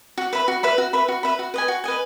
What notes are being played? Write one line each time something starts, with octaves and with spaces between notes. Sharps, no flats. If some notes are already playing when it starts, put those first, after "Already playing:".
F#4
B4 E5 B5
F#4
B4 E5 B5
F#4
B4 E5 B5
F#4
B4 E5 B5
F#4
B4 D#5 G#5
F#4
B4 D#5 G#5